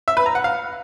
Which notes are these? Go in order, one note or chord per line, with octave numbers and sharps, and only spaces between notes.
E5
B4
A#5
F#5
F5